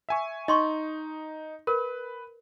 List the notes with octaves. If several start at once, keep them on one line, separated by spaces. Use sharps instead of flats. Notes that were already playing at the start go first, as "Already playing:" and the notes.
E5 G#5 C#6
D#4 D#5 C6 C#6
A#4 B4